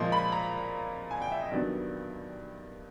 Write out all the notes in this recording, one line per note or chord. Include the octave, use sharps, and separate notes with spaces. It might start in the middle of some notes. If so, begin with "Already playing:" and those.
Already playing: A#2 F3 G#3 C6
B5
A#5
G#5
G5
E5
D#5
G2 D#3 F#3 B3 D5